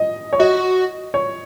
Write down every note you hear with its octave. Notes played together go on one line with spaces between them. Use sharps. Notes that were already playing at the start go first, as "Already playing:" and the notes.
Already playing: D#5
C#5
F#4 D#5
C#5